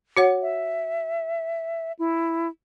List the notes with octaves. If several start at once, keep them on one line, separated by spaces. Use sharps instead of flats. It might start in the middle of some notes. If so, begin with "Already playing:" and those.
F#4 C#5 F#5
E5
E4